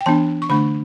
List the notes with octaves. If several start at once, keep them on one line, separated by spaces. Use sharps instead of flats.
G5
E3 B3 D4 A5
C#6
D3 A3 D4 B5